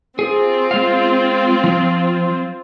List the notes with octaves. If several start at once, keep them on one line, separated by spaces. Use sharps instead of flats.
C4 F4 G#4
G#3 F5
F3